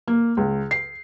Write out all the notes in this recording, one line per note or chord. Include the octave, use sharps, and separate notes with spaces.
A#3
C#2
C7